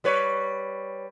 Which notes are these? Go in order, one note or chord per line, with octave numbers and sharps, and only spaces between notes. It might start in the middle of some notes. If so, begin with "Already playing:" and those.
G3 B4 C#5